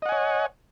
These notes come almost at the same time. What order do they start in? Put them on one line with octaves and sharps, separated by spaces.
D#5 F#5 G#5 C#5